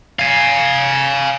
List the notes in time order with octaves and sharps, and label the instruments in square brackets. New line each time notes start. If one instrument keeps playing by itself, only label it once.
[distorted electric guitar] F5 G#5